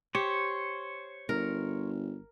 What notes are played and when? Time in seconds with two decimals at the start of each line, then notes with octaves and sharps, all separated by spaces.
0.15 G4 C5 C#5
1.29 G1 A#4